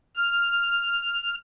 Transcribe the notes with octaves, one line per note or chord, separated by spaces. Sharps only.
F6